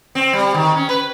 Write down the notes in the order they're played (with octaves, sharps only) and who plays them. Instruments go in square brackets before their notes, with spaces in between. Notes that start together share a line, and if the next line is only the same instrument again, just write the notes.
[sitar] C4
G3
D#3
C#4
B4